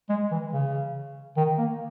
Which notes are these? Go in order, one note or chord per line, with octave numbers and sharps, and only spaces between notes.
G#3
E3
C#3
D#3
A#3